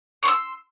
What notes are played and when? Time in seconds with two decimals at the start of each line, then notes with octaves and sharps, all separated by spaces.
0.23 C#6
0.25 C6
0.28 E6